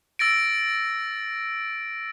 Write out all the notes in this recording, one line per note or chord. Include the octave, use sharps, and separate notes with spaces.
E6 A6 A#6 D7